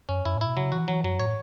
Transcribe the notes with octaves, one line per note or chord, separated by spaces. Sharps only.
F#2 C#4
F#2 E4
A2
E4
B2
C#3 F#3
E3 F#4
E3 F#3
F#2 F#3
A2 C#5